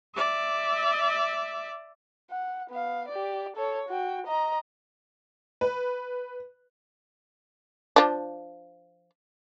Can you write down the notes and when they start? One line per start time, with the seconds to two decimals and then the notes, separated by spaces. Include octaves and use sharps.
0.15 D5 E5
2.30 F#5
2.70 B3 F5
3.08 G4 D5
3.56 A4 C#5
3.89 F#4 G5
4.27 D#5 A#5
5.61 B4
7.96 F3 D4